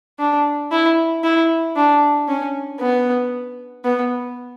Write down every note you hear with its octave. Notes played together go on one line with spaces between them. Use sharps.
D4
E4
E4
D4
C#4
B3
B3